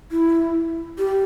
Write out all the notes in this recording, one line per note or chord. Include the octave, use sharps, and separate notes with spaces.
E4
G4